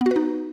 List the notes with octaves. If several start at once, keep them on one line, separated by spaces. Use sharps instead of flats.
B3
F#4
B4
D#4